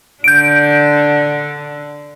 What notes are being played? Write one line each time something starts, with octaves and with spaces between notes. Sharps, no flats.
D3 D4 G6 D7